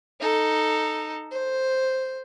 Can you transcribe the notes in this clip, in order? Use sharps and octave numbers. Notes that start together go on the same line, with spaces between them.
D#4 A4
C5